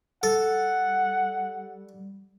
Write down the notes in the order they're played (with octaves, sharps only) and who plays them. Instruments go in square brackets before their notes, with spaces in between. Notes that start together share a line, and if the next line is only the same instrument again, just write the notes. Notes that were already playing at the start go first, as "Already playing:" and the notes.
[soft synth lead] G3 [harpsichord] A4 [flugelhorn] F#5